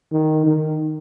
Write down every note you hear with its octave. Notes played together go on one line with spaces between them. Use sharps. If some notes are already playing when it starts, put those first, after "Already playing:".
D#3
D#3